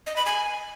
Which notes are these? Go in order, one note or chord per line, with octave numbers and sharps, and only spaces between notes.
D#5
B5
G#5